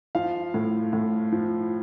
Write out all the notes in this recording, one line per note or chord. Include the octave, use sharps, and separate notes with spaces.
F3 F5
A2
A2
F3